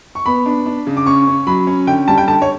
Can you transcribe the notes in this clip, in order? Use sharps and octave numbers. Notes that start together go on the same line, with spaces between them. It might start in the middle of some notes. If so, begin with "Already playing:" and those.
C#6
B3 B5
D4
D4
C#3
D6
C#4 C#6
C#4
F#3 B5
C#4
D3 G5
G3 A5
G5
D3 A5
C#5